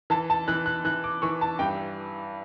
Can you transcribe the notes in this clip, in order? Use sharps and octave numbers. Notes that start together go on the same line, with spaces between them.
E3 A5
A5
E3 F#6
F#6
E3 F#6
D6
E3 C#6
A5
G2 G5